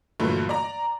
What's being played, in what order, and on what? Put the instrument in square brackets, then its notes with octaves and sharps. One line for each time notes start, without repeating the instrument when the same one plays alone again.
[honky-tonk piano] G2 A#2 D3 E3 F#3 A3
D5 A#5